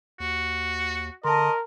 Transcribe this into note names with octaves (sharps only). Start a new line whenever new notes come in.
D#2 F#4
D3 A#4 D#5 A5 C6